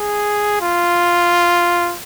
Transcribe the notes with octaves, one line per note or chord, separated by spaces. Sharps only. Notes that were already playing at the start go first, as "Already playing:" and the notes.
Already playing: G#4
F4